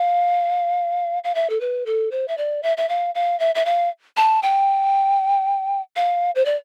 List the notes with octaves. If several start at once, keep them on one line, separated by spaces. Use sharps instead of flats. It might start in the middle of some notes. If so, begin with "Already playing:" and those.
Already playing: F5
F5
E5
A4
B4
A4
C5
E5
D5
E5
E5
F5
F5
E5
E5
F5
A5
G5
F5
C5
D5